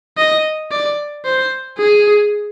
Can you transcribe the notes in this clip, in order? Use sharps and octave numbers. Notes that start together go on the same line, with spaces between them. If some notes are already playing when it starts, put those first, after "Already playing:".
D#5
D5
C5
G#4